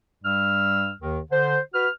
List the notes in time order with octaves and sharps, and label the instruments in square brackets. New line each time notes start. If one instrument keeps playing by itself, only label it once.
[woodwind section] G2 G3 E6 F6
D#2 D#3
D3 C5
F#4 B4 F6